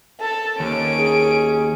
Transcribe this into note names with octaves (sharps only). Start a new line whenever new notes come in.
A4
D#2 C#4 D7
G#4